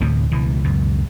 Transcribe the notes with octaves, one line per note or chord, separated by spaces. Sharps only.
D2 A2 C3 E3
C#2 B2 E3
C#2 F#2 B2